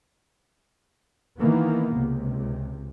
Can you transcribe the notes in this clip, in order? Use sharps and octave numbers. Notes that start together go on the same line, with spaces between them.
D#3 E3 A#3 B3
C#2 C3